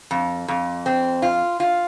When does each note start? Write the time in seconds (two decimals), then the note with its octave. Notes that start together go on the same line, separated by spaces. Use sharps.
0.11 F2
0.48 F2
0.86 C4
1.22 F4
1.60 F4